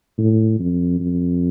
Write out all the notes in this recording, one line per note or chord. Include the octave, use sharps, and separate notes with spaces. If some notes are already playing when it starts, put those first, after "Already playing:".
A2
F2
F2